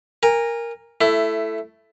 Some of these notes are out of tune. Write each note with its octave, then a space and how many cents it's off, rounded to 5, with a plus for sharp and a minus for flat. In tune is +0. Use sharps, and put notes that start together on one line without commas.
A#4 +0 G#5 -30
A3 +0 E4 +15